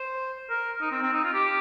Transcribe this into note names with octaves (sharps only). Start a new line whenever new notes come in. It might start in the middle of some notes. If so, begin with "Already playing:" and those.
Already playing: C5
A#4
D#4
C4
C4
D#4
F4
G4